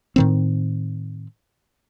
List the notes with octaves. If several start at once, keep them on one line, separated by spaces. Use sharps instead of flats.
A2 D#3 C4